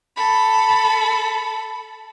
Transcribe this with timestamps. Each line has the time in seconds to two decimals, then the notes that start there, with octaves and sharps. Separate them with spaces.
0.16 A4 B5